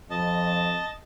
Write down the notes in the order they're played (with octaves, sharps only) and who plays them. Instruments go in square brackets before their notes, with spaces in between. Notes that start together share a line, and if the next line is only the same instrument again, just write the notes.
[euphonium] F2 [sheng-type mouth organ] D#5 A5